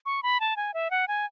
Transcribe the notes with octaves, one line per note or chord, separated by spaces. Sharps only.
C#6
B5
A5
G#5
E5
F#5
G#5